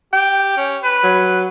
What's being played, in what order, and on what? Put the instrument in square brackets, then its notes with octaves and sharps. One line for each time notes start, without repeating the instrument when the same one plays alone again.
[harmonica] G4 [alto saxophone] G5
[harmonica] C#4
B4
[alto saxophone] F#3